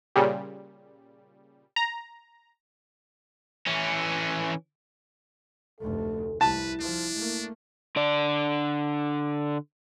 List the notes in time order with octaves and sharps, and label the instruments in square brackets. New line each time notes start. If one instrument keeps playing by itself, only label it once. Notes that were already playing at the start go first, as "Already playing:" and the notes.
[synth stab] A#2 C#3 G3
A#5
[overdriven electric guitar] E3 C#4
[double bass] F1 D2 [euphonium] A4
[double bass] C2 [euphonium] E4 [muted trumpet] B4 [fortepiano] A5
[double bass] F3 [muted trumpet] D4
[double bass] A3 A#3
[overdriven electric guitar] D3 D5